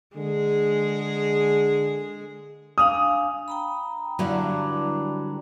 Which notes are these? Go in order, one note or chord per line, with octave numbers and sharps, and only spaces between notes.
D3 G#3 G#4
D4 F5 G#5 D#6
G5 A#5 B5
G2 D3 F#3 E4